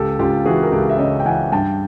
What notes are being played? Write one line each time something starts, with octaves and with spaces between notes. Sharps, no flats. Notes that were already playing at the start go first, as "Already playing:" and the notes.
Already playing: C#2 G4 A4
C#2 F4 G4
E3 F#4 G#4
A#4
C#2 G4 A4
E5
C#3 C#5 D#5
G5
E3 F#5 G#5
G2 G5 A5